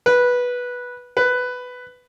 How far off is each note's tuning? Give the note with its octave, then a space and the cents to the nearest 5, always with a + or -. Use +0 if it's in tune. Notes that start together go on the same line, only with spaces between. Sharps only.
B4 -10
B4 +10